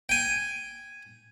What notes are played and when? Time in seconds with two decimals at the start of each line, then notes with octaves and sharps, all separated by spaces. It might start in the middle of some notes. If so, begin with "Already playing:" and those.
0.09 G5 G#5